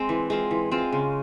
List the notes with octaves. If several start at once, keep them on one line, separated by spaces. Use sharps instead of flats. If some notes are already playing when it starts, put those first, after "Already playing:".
Already playing: G#3 C4
E3
G#3 C4 F4
E3
G#3 C4 F4
C#3